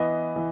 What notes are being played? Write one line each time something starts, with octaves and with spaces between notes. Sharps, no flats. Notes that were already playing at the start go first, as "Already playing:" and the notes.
Already playing: E3 B3 D#5
E3